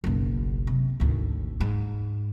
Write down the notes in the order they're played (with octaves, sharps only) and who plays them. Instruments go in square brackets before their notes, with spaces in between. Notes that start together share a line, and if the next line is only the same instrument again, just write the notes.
[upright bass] F#1 B1
C3
G#1 D2
G#2